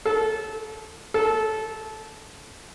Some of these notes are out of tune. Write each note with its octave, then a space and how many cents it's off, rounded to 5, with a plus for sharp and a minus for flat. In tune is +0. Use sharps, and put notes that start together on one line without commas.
A4 -25
A4 -20